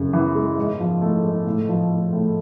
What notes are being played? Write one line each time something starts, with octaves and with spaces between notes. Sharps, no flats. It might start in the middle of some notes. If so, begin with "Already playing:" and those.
Already playing: F#2 C#3
E3
G#3
G#2
F3
A3
G#2
A2
F3
A3
A2